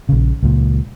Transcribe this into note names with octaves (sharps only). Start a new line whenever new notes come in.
A#1 C#3
C#2 A#2